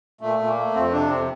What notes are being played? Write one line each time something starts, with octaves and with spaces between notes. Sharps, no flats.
A#2 A3
A#2
A#3
A3
F2 C4
C3 D4
F2 C4